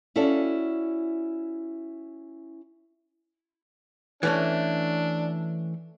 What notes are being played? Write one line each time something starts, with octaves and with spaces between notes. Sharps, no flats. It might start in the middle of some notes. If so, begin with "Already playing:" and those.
C#4 E4 F#4 A4 D5 F5
E3 A3 C#4 D4